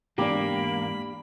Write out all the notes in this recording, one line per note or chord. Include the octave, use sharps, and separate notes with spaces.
E2 G#2 A#3 D4 G4 B5